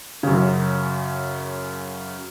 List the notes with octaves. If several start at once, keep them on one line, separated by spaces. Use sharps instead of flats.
F#2 C#3